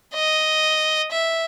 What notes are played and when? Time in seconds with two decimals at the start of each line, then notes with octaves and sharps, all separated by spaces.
0.13 D#5
1.11 E5